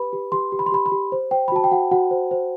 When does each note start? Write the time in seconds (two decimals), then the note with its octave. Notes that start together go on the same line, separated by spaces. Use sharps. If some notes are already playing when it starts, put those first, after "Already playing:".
Already playing: G4 B4 B5
0.13 G4
0.32 G4 C6
0.52 G4
0.59 B5
0.66 C6
0.72 G4 B5
0.86 B5
0.92 G4
1.12 C5
1.31 C5 G5
1.48 B5
1.52 F#4 A5
1.64 G5
1.71 F#4 F#5
1.91 F#4 F#5
2.11 C5
2.31 C5